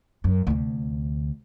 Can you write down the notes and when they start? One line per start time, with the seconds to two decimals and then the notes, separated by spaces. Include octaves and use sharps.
0.24 F#2
0.47 D2 C3